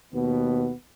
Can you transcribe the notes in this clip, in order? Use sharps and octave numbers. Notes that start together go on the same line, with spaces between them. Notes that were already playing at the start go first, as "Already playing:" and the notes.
D#2 B2 B3